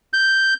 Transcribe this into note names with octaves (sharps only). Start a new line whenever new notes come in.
G6